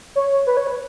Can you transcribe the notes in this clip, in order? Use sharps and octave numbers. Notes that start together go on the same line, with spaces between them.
C#5
B4
C#5
B4